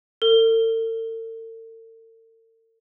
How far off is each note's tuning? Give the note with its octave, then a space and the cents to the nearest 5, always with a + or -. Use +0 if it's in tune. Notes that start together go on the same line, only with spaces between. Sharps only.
A4 +45